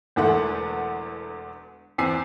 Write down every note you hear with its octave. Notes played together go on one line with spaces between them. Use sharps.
E1 E2 D3 A3 F#5 C6
E2 C4 G#5 E6 C7